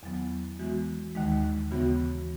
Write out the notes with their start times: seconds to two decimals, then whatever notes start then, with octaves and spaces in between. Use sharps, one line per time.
0.03 E2 D#3 F#3 B3
0.59 E3 G#3 B3 F#4
1.15 D#2 D#3 G#3 D#4
1.71 D#2 C#3 E3 B3 F#4